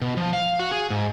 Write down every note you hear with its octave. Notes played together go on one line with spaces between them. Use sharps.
B2
F3
F5
F#4
G#4
G#2